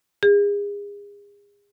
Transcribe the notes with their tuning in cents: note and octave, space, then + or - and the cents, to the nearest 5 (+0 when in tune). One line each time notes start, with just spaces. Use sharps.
G#4 -35